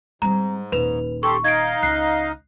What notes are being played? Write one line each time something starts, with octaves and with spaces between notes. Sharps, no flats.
G#2 G3 C4 A#5
D#1 B4 F7
G4 A4 C6 C#6
D#4 D#5 F5 G#6 D7
C#2 F#6 C7